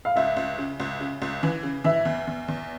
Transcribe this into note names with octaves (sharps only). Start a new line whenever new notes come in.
F5
C#2 E5
C#2
C#3
C#2
C#3
C#2
E3
C#3
E3 E5
E2
E2
E2